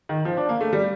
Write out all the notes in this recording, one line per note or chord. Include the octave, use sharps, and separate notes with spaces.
D#3
F3
D4
A#3
A3
G3